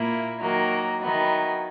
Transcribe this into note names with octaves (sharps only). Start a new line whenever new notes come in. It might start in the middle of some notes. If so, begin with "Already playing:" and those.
Already playing: A#2 A#3 E4
D#3 F#3 A#3
D#3 F#3 B3 E4